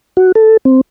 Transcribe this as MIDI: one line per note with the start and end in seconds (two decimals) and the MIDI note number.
0.17 0.32 66
0.35 0.57 69
0.65 0.81 60